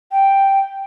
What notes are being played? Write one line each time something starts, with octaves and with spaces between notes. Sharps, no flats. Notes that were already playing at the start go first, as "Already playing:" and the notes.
G5